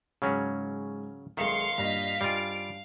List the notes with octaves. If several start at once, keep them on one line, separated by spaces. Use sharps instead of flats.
G#2 C#3 F#3 C#4 G#5 F6
B1 D#3 G#3 E5 F5 C6 C#7
G2 A#2 D#5 A#6 B6
G2 G3 F4 G#5 D7